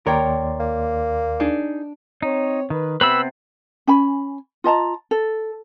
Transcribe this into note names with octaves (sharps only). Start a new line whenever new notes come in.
D#2 A#4 C#5 D5 G5 C6
A#3
D4 D#4 G#4
C4 D#4 C#5
D#3 B4
C3 B3 C4 B4 B5 E6
C#4 G#5 B5
F4 D#5 A5 A#5
A4